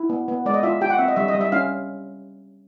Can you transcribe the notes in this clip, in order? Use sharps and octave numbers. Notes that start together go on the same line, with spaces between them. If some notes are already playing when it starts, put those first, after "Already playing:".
Already playing: E4
B3
B3
G#3 D5
D#5
F4 E5
G4 G5
F#5
C4 E5
D#5
G3 E5
D#5
G3
E5
C#4 F5